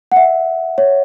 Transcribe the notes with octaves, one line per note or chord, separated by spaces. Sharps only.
F#5
E5
C#5